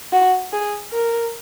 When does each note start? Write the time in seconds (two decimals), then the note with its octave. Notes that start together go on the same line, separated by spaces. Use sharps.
0.13 F#4
0.53 G#4
0.92 A#4